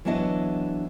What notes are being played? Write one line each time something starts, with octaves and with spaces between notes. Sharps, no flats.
E3 F#3 B3 D4 E4 D#5